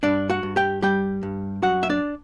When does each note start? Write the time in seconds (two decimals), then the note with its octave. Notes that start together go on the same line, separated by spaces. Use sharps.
0.03 G2 D4 D5
0.30 F#4 F#5
0.43 G2
0.56 G4 G5
0.82 G3 G4 G5
1.23 G2
1.62 F#2 F#4 F#5
1.83 E5
1.89 D4 D5